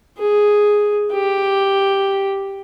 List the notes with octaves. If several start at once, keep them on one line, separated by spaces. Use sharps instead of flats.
G#4
G4